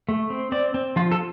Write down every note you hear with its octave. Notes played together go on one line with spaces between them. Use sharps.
A3
C4
C4 D5
C4
F3 F4
A4